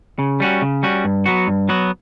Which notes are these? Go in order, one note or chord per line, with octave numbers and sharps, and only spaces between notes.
C#3
G3 C#4 F#4
C#3
G3 C#4 F#4
G2
F#3 B3 F#4
G2
F#3 B3 F#4